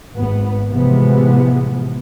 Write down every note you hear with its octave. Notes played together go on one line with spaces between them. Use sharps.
G#1 B3
A2 C3 E3 F3 G#3 B3